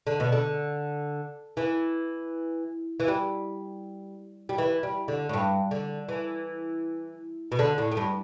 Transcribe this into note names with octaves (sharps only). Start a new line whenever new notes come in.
D3
B2
D3
E3
E3
G3
G3
E3
G3
D3
A2
G2
D3
E3
B2
D3
A2
A2
G2